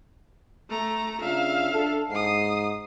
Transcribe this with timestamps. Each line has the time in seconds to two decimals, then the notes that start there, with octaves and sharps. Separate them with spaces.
0.70 A3 A#5
1.21 C#3 D4 F4 E5 F5
1.73 D4 A4
2.11 G#2 D#6 C7